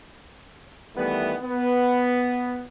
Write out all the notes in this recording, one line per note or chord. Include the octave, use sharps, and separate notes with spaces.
D#3 E3 G3 A3 B3
B3